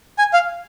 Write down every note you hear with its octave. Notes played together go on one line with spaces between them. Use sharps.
G#5
F5